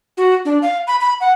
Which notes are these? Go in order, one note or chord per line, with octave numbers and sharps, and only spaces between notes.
F#4
D4
F5
B5
B5
F#5